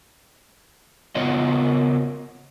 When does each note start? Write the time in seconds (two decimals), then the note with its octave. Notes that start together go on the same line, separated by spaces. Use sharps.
1.15 C#3 B3 F4 A#4 C#5 D#5